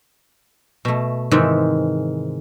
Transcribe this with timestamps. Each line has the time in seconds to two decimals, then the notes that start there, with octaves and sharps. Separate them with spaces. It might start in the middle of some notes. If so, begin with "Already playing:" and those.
0.85 B2 A3
1.31 G#2 C3 D#3 E3